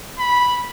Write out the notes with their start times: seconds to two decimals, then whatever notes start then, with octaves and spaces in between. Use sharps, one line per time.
0.19 B5